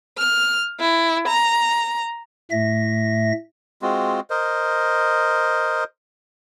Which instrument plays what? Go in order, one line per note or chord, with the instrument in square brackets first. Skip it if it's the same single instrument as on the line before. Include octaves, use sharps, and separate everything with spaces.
[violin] F6
E4
A#5
[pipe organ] A2 A3 E5 A#6
[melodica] G#3 C4 F4 F#4
A#4 C5 D#5